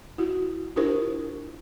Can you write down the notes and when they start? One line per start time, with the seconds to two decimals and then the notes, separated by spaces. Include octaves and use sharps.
0.18 E4 F#4
0.76 D4 E4 F4 G4 A#4 C5